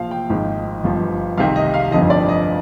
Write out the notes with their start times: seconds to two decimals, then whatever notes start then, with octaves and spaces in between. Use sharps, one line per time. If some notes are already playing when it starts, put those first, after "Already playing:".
Already playing: A#1 A#2 F3 F5
0.11 G5
0.30 G#1 G#2 F3
0.84 G1 G2 F3
1.38 C2 C3 D#3 F5
1.56 D#5
1.74 F5
1.91 G1 F2 D3 F3 D#5
2.10 D5
2.29 D#5